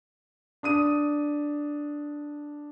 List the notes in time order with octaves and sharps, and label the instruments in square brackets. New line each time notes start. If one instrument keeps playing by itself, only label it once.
[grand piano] D4 D#6 D#7